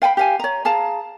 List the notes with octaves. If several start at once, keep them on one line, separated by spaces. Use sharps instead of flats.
F5 G5 G#5 B5
G4 F5 G#5
C#5 A#5
G#4 F5 A5 A#5